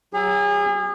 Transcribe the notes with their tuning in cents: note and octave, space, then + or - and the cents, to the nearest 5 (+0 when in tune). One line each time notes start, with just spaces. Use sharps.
F#3 +15 G#4 -35